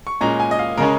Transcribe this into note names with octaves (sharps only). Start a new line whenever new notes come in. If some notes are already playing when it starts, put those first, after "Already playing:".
C#6
A#2 G#3 C#4 A#5
G#5
D#5
F5
C#3 G#3 C#4 A#4